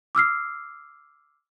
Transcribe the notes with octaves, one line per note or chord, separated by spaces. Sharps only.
D6 E6 F6 C7